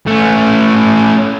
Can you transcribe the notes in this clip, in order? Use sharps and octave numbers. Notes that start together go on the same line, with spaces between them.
A3 C#4